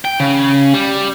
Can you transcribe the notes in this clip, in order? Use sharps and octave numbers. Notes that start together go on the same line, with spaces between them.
G5
C#3
G3